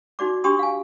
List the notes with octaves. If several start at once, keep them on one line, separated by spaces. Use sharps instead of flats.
D#4 F#4 D5 D6
D4 G4 A5 C6 C#6 D#6
F5 G#5